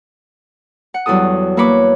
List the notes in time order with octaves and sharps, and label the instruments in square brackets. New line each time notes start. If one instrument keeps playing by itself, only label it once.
[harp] F#5
E2 F#3 G3 E4 A4 D#6
A#3 E4 B4 C#5 B5 D6